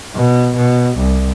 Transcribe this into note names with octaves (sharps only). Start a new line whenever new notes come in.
B2
B2
C2